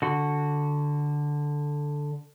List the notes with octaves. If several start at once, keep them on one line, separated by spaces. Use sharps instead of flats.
D3 F#4